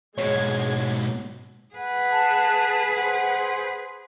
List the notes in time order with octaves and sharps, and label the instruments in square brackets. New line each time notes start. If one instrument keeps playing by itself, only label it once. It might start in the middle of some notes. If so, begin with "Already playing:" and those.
[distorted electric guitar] G#2 B2 [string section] G#3 G#6 [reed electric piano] C#5
[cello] G#4 B4 [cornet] F#5
[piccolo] A5
[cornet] C5 [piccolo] F#5